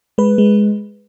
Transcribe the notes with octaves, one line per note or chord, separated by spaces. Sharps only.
G#3 B4
G#3